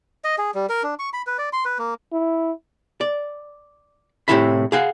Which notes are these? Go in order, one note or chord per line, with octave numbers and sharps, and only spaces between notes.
D#5
G#4
G3
A#4
D4
C#6
B5
B4
D5
C6
B4
A#3
E4
D5
A2 C3 D#3 E4 E5 B5
G#4 F5 F#5